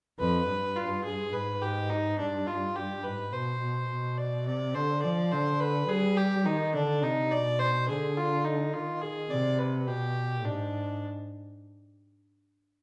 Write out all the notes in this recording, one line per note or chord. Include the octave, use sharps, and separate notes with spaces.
F2 B4
G2
F4
G#4
G#2 B4
G4
D#4
G2 D4
F4
G4
G#2 B4
B2 C5
B2
B2
D5
C3 D5
D3 C5
F3 D5
D3 C5
B4
G3 G#4
G4
D#3 D#4
D3 D4
C3 D#4
B2 D5
C5
D3 G#4
F4
D#4
D#3 F4
G#4
C3 D5
B4
B2 G4
G#2 D4